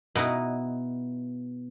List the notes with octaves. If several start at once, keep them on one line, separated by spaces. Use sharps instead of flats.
B2 B3 D#4 E4